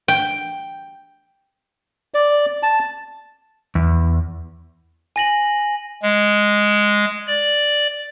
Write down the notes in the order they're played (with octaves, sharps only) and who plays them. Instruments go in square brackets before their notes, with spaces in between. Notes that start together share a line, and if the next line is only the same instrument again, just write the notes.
[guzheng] G5
[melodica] D5
A5
[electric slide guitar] E2
[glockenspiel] G#5 A#6 F#7
[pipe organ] G#3
D5